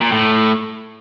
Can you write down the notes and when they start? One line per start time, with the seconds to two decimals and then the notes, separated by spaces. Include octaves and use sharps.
0.01 A#2
0.12 A2